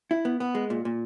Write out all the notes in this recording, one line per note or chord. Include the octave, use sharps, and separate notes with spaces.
E4
B3
B3
G#3
A#2
A#2